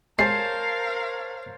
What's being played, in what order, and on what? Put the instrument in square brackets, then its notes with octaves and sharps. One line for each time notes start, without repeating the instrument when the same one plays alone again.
[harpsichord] G#3 [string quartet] A#4 F5 [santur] C5 C#5 A5 [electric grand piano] C7